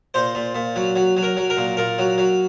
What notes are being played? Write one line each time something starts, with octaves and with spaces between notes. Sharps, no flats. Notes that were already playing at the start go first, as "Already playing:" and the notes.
A#2 C5
A#2
A#2
F#3
F#3
F#3
A#4
F#3
A#4
A#2
A#2 A#4
F#3
F#3